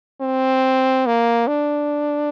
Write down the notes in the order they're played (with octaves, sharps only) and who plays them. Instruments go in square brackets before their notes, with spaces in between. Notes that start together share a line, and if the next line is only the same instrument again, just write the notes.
[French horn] C4
A#3
D4